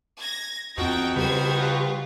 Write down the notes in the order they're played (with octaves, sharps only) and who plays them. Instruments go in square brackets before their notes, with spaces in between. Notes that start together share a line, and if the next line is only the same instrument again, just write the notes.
[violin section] G#6 A#6
[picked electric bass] E2 C4 [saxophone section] F3 D#4 F#4 [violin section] G5
[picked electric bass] C#3 G3 [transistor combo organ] G4 B4 [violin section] C5 G#6
[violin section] F4